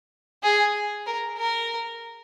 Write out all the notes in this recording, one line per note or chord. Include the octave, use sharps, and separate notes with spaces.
G#4
A#4
A#4